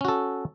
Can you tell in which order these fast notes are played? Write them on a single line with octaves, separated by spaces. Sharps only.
C#4 F#4 A4